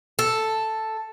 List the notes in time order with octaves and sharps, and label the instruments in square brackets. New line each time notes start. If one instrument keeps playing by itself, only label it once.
[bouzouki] A4